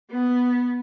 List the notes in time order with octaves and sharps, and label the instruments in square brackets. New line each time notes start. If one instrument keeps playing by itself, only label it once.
[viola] B3